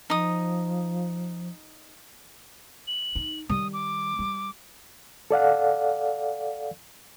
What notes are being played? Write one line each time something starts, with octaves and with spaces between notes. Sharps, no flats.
F3 D#4 D#6
F#7
D#4
D#3 G3 D#6
D6
G3
A4 D5 F5 F#5